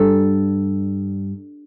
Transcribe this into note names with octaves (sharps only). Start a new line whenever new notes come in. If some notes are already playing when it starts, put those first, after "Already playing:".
Already playing: G2 G3 A4